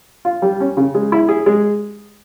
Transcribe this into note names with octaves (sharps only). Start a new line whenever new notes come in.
F4
G3
C#4
C#3
G#3
E4
G#4
G#3